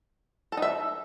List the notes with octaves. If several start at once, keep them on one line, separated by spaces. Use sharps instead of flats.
A4
D#4
E5